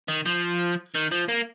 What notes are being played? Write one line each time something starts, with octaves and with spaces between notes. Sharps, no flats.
D#3
F3
D#3
F3
A#3